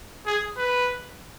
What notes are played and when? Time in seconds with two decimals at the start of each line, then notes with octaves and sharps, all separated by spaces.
0.26 G#4
0.57 B4